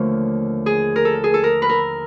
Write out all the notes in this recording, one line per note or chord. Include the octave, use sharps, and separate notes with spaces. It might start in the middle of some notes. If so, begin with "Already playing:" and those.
Already playing: D#2 D3 F3 A3 C4 C#5
G#4
A#4
A4
G#4
A4
A#4
B4
A#4